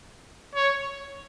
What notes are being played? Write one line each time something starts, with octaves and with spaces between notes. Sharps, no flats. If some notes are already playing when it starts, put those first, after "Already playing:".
C#5